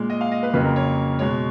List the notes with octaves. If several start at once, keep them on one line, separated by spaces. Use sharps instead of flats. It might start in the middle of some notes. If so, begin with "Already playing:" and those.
Already playing: A#2 G#3
D#5
F5
D#5
B4
F2 C#3 F#3 A#3 B4
A#4
C#5
B2 G#3 C#5